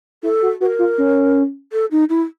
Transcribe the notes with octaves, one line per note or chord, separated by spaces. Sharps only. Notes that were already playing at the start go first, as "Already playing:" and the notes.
E4 A4
F#4
F#4 B4
A#4
F4
C#4
A4
D#4
E4